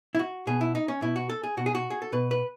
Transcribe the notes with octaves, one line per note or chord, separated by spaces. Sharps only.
E4
F#4
B2 G#4
E4
D#4
C#4
B2 E4
F#4
A4
G#4
B2 F#4
G#4
F#4
G#4
A4
B2 B4
B4